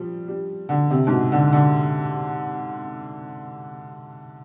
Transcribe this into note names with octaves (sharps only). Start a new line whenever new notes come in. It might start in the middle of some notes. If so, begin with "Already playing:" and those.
Already playing: F3 G3
G3
D3
C3
G#2
B2
D3
D3